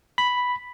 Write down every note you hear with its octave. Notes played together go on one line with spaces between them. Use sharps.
B5